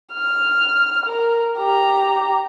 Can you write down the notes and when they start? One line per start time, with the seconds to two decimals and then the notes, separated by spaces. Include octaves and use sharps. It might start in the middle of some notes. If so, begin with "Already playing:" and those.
0.13 F6
1.06 A#4
1.58 G4 A#5